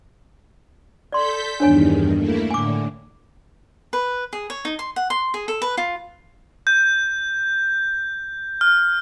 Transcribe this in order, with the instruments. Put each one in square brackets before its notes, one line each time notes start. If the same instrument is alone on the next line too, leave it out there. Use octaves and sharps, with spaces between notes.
[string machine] A4 G6 B6 [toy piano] D5 C6
[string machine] E2 G2 D#3 [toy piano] D4 C#5 G#5
[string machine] A3 A#3 E4
[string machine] A2 D3 [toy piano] G#5 D6
[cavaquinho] B4
G#4
C#5
D#4
C6
F#5
C6
G#4
A4
B4
F4
[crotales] G6
F6